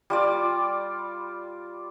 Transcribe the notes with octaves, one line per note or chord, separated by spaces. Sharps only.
G3 F4 D5